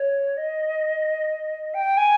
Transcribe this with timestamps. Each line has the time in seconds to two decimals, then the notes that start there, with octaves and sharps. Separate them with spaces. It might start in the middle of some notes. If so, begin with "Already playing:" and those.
Already playing: C#5
0.37 D#5
1.74 G5
1.97 G#5